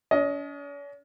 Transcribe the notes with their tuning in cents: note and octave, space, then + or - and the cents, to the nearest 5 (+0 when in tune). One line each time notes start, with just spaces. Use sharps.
C#4 +45 D#5 +15